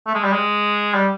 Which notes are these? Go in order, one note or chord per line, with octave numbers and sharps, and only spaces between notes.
A3
G#3
G3
G#3
G3